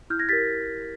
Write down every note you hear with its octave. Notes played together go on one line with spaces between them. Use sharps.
E4 F6 G6
G#6 A#6
G4 A#4 A6 B6